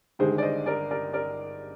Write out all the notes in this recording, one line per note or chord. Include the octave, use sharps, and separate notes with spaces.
G1 G2 D#3 G#3 G#4 C5
D5
C5 D#5
A#4 D5
A#4 D5
A#4 D5